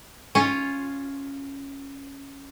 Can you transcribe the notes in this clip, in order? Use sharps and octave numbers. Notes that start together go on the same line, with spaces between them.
C#4 F4